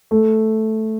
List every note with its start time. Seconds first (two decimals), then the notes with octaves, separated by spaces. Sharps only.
0.11 A3